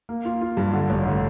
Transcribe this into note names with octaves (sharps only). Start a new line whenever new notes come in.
A#3
F4
F4
G2
D3
A1
D3